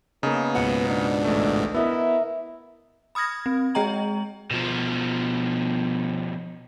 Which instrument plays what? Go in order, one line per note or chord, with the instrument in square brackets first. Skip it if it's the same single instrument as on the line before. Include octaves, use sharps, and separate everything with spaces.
[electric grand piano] C#3 A#3 [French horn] B3 [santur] D#4
[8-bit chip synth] C#2 G#2 B2 [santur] F#5
[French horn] D4
[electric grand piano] A1 A3
[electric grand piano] B3 [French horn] E4 [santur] A#4 D#5 E5
[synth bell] B5 D#6 F6 G#6 A#6
C4
G#3 G#4 D#5 G5 A#5 F#7
[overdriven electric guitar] B2 F3